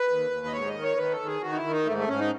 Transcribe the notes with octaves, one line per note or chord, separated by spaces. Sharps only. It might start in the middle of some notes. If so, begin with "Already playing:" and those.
Already playing: B4
D#2
D#2
D#5
G#2 C#5
D#5
D#3
C#5
D#3 B4
A4
D#3
G#4
D#3 F#4
D#4
E4
D#3
D#4
G#2 A3
A3
G#2 C#4
D#4